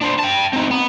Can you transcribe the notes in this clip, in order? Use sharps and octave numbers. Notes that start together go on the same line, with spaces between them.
D4 C5
G5 A5
C4 D#4
B3